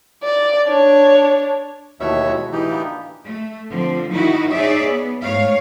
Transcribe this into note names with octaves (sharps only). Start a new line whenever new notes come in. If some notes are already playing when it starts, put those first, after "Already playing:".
D5
D4 C#5
D#2 B2 E3 A3 C#5 E5
E3 G#3 F#4
A2 E3 D#4 G4
D3 A#3 B3
A3
D3 F3 C4
D#3 D#4 E4 F#4
D#4 G#4 C#5 D5 E5
B3
G#2 A3 C#5 F5